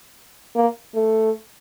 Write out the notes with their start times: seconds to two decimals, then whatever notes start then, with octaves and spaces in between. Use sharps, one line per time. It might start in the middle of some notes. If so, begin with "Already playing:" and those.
0.55 A#3
0.95 A3